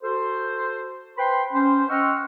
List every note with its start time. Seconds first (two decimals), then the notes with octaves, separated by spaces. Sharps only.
0.03 F#4 A4 C5
1.17 B4 C5 G5 B5 C6
1.53 C#4 C5
1.89 D#5 F#5 G5 C#6 E6 F6